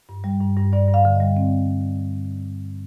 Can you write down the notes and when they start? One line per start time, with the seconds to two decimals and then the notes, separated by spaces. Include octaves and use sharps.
0.09 G2
0.24 G3
0.41 G2
0.57 G2
0.73 G2 D5
0.89 G2
0.94 F5
1.05 D3
1.15 G3 D#5
1.37 C4